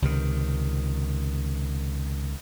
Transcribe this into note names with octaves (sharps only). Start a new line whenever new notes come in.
C#2 C3 D#3